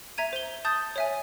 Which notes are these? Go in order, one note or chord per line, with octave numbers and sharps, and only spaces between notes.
E5 A#5 G#6 D#7
C5 G7
A5 D#6 G6 A6
C#5 E5 G#5